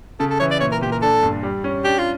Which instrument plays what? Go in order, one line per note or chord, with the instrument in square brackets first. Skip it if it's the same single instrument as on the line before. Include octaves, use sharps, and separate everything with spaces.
[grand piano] C#3 [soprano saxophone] A4
[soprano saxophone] A4
[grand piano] E3 [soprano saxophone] C#5
[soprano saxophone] D5
[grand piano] A#2 [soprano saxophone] C#5
[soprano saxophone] A#4
[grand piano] A#2 [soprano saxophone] G4
[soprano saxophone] A#4
[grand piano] D4 [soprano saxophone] A4
[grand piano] G2
G3
C#4
[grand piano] D4 [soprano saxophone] G4
[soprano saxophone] F4